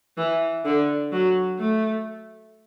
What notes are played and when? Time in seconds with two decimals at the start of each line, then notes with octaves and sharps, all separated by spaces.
0.17 E3
0.65 D3
1.12 F#3
1.59 A3